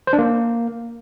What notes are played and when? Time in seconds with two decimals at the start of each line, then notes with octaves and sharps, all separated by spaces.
0.07 C5
0.13 D4
0.19 A#3